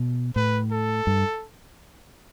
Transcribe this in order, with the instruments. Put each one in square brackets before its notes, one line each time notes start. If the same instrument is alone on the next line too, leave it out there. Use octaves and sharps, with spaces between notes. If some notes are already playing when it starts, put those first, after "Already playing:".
Already playing: [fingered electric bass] B2
[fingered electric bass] A2 [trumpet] B4
[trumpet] A4
[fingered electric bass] G2